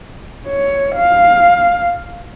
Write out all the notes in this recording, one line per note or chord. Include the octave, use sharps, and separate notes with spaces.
C#5
F5